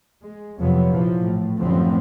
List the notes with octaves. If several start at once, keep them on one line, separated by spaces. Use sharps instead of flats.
G#3
F2 C3 F3 F#3 B3
A#1 E3 F3
A2
A1 F#2 D3 F3 B3 C4